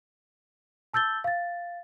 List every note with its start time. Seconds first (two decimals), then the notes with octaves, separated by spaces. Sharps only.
0.93 A5 E6 G6 A6 G7
1.24 F5 A6